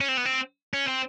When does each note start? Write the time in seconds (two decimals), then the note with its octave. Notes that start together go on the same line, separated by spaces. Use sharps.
0.01 C#4
0.08 C4
0.17 B3
0.25 C4
0.74 C#4
0.87 C4